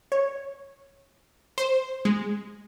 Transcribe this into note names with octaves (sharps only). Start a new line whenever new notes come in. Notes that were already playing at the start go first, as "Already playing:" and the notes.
C#5
C5
G#3